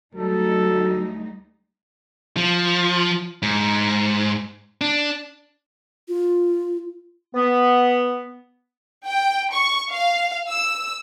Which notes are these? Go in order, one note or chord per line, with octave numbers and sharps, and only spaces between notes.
D2 F#3 G3 D#4 A4
F3
G#2
D4
F4
B3
G5
C#6
F5
E6